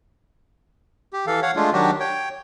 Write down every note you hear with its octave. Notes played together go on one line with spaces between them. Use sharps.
G4
E3 A4 F5
C#5 F5 F#5
G#3 A3 D4 F4
D#3 F#3 D4 F#4 G4
C#5 G5